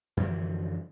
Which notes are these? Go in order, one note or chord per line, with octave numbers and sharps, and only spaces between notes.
F#2 D3 E3 F3